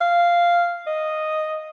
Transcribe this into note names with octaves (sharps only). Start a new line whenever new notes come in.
F5
D#5